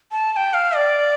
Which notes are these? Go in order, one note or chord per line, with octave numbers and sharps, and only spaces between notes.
A5
A5
G5
F5
D5